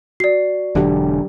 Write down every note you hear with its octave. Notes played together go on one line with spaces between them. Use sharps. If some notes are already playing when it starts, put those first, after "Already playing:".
F#4 D5 C7
E1 D3 F#3 G4